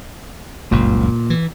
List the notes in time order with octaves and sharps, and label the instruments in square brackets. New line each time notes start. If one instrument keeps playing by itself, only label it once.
[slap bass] F#1 C#2 G2 [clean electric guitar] A#2
[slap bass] E3